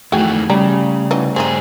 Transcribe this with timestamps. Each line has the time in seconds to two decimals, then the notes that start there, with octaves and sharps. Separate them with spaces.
0.12 F2 D#3 E3 A3 F#4 G#4 G5
0.50 C#3 G3 A#5
1.11 E3 F#3 D#4
1.36 G2 C4 D4 D#4 G#4